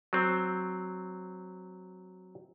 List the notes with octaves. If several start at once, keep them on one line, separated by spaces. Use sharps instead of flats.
F#3 C4